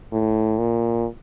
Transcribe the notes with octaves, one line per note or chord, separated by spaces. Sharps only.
A2
A#2